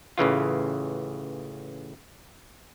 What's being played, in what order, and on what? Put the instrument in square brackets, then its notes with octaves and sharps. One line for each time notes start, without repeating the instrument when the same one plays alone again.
[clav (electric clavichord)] A1 C#3 E3 F4